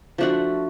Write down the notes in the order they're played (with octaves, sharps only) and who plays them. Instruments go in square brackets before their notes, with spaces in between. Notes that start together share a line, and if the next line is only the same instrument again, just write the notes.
[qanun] F3 A3 D4 F#4